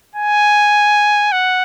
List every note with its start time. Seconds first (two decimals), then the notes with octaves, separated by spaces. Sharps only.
0.16 G#5
1.32 F#5